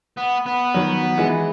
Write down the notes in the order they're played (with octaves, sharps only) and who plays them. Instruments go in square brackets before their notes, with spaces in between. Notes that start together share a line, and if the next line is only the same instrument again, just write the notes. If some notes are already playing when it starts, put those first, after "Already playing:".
[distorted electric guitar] B3
B3
[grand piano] D#3 F#3
E3 G#3